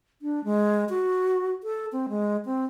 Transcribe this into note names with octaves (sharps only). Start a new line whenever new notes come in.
D4
G#3
F#4
A4
C4
G#3
C4